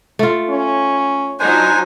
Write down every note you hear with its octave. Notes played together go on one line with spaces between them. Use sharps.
A3 F4
C#4
F3 F#3 D4 D#4 C5 G#5